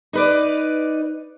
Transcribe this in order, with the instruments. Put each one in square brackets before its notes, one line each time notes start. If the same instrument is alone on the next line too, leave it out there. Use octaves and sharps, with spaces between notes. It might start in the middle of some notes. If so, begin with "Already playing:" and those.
[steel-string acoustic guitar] D#4 B4 D5